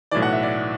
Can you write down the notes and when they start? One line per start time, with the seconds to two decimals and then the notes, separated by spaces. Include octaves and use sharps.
0.11 B1 A2 E3 D5
0.22 F#5
0.33 E5
0.43 D5